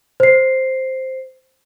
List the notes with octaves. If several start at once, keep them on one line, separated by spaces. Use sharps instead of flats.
C5 C7